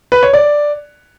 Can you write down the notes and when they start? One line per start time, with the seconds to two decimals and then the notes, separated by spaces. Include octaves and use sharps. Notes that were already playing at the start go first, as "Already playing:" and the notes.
0.12 B4
0.23 C#5
0.33 D5